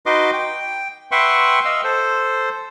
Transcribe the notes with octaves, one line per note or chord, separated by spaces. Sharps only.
D#4 F#4 B4 D#5 C6 D6
G5
B4 E5 F#5 G5 C6 C#6
D#5 F5 E6
A4 C5